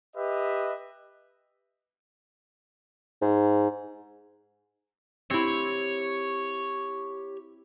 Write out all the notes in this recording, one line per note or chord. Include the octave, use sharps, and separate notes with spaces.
G4 B4 D#5 E5
G#2
C4 E4 G4 C#5